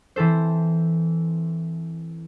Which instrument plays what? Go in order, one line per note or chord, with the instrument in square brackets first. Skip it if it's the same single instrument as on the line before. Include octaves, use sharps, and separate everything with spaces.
[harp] E3 C4 A4 C5